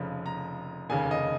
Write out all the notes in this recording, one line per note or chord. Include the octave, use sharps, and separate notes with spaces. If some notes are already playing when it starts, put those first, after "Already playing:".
Already playing: F1 F2 C#3 F3
A#5
F1 D#2 C#3 G#5
D#5